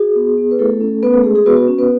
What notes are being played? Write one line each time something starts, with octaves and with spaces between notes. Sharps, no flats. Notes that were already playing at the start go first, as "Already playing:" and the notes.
Already playing: F#4 G#4
B3
B3
B4
A3 E4 A4
C#4
B3 C#4 B4
A3 A4
G#3 G#4
G#4
B3 F#4 B4
F#4
C#4 F#4
B3 B4